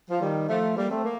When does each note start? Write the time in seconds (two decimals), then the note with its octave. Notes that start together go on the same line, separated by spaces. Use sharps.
0.10 F3
0.21 D#3 G3
0.49 F3 A3
0.77 G3 A#3
0.90 A3 C4
1.04 A#3